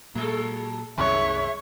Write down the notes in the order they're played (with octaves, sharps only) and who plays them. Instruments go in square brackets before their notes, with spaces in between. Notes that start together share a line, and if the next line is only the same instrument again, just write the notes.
[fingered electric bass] A#2 [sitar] F#3 G#3 A4
[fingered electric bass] C2 F#2 [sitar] B2 D#3 G#3 [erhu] C#5 [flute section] E5